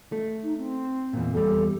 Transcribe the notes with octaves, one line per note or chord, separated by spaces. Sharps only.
A3
D#4
C4
E2 A#2
E2 G3 A4